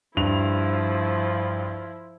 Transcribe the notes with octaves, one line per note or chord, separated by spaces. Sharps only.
G2 F3 E4 F7